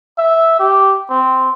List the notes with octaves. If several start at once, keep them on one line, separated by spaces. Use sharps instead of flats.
E5
G4
C4